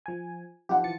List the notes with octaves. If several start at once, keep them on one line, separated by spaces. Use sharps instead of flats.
F3 G#5
F3 D#4 F4 G4 F#5
E3 A6 C#7